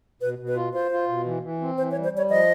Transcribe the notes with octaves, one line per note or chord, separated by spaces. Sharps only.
B2 B4
B2
B4
F4
F4 C5
F4
B2
E3
E3
C4
E3 C5
C#5
G3
C5
G3 C#5
F3 D#5